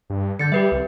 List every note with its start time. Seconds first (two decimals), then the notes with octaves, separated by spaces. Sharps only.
0.10 G2
0.39 D3 G6 A6 C#7
0.52 G3 G4 B4 E5
0.72 C2